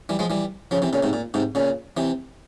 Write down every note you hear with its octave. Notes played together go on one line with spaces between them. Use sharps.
E3 G3
F3 G#3
E3 G3
C#3 F3
C3 E3
A#2 C#3
G#2 C3
A#2
G#2 C3
A#2 C#3
C3 E3